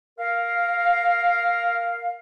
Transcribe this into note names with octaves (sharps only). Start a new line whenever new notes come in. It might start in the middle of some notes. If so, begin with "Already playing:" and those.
A#4 F5